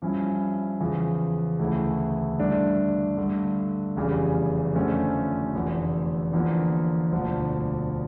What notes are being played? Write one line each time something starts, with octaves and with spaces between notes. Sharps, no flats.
G2 F3 C#4 E4
E2 C#3 F3
D2 C#3 E3 A3 E4
G2 D3 A3 D4
G2 D3 A3
F1 E2 C#3 E3 G3
F2 D3 F3 A3 C#4
F1 E2 D3
E2 D3 F3 A#3
E1 D2 D3 F3